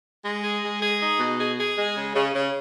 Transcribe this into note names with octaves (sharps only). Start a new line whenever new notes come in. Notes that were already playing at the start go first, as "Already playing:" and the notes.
G#3
G#4
G#3
G#4
D#4
B2
G#4
G#4
G#3
C#3
C#3
C#3